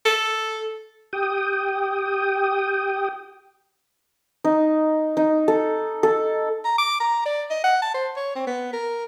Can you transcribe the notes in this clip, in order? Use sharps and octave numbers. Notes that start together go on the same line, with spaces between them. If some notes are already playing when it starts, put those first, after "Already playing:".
A4
G4 G5 D#6
D#4
D#4
A4
A4
A#5
D6
A#5
D5
D#5
F#5
A5
C5
C#5
C4
B3
A#4